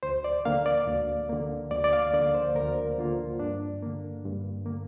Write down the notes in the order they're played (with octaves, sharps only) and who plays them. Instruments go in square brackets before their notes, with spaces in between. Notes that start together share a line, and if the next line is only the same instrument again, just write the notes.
[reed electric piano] D2 C5
D5
D3 A#3 F5
D5
D2
D3 A#3
D2 D5
D5
F5
D3 A#3 D5
C5
D2 A#4
D3 A#3 F4
G2 D4
D3 A#3
G2
D3 A#3